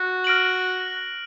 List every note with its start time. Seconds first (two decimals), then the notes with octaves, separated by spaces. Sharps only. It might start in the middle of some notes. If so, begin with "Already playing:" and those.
Already playing: F#4
0.24 F6 A#6 D7 F#7